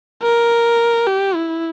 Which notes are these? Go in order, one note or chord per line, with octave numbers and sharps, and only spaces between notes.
A#4
G4
E4